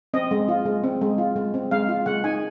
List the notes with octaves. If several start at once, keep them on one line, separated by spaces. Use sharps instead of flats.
C4 D#5
G#3
F4
G#3
C4
G#3
F4
G#3
C4
G#3 F5
F4
G#3 F#5
D#4 G#5